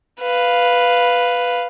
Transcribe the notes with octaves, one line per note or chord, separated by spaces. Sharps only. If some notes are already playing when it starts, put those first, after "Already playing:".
B4 F5